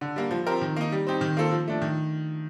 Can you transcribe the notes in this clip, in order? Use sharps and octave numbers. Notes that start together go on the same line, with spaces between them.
D3
G3 A#3
F3
C4 G4 A#4
D#3
A#3 D#4
G3
C4 D#4 G4
D#3
A#3 F4 A4 C5
F3
A3 D4
D#3